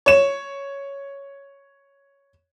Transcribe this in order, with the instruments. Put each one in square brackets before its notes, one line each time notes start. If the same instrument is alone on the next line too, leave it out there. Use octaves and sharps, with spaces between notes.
[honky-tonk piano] C#5 E7